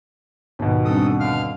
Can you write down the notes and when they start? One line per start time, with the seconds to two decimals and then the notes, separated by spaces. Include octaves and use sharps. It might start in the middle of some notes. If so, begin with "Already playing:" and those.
0.59 D#2 G#2 B2 B3
0.85 G#2 G3 C4 D4 A4 D#6
1.20 D3 F5 F6